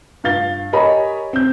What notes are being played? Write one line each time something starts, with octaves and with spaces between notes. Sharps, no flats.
G2 F4 F5 A6 G7
G4 A#4 C#5 D#5 G#5 B5
C4 G6